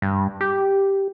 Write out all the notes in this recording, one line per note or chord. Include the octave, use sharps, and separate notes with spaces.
G2
G4